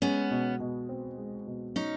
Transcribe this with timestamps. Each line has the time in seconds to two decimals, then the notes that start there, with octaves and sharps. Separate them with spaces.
0.02 G#3 B3 C#4
0.31 B2
0.60 B2
0.89 C4
1.18 G#3
1.47 B2
1.76 C#4 D#4